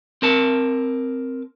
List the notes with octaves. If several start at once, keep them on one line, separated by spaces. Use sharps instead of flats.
C4 A#4 A5